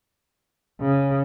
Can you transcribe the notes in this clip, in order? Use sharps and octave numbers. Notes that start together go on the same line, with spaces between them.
C#3